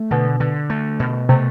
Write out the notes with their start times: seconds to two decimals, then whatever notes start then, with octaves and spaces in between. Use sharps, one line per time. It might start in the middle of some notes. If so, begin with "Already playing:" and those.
Already playing: A3
0.11 B2 D3
0.40 D3
0.70 A3
1.00 B2
1.29 C3 A3